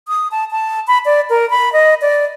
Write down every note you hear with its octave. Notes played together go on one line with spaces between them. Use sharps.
D#6
A5
A5
B5
D5
A#4
B5
D#5
D5